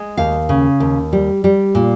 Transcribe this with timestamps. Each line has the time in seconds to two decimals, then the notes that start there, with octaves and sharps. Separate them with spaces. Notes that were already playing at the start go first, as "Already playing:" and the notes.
Already playing: G#3
0.17 D#2 F5
0.49 C#3
0.80 D#2
1.13 G3
1.44 G3
1.75 A#2